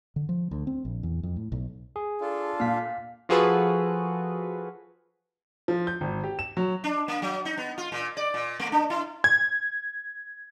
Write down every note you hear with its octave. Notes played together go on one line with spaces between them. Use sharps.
D3
F3
D2
C4
A#1
E2
F2
A2
B1
G#4
D4 F4 A4
A#2 F5 B6
F3 F4 F#4 G#4 A4 B4
F3
G6
G#1
G4
E7
F#3
D4
A#3
F#3
D#4
B3
F4
A#2
D5
A#2
A3
D4
E4
G#6